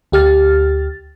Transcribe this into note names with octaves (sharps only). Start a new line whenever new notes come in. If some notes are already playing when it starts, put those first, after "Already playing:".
D2 G4 F6 A6